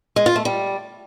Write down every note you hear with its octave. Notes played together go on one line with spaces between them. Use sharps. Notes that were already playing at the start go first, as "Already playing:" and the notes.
G#3
F4
A3
G3